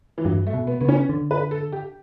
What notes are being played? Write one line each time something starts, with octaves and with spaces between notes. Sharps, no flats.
E3
G2 F#3
A3
B2
B3
C#3 B3
C#4
D3
B4
A4
G4